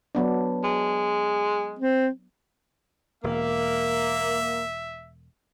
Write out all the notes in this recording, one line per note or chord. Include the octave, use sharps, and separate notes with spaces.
F#3 B3 D4
G#3
C4
E1 A#3 E5